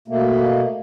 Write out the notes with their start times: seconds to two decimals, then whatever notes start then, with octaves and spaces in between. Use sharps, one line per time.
0.08 B2 A3 A#3